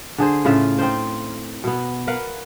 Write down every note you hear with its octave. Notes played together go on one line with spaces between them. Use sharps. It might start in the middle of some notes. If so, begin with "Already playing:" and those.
D3 G#4 C5
A2 C#3 F4 E5
C4 D#4 F4 C5
B2 B3
A#4 B4 F5 F#5